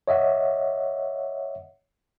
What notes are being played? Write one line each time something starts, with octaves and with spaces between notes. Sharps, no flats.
C#5 D#5 E5 F#5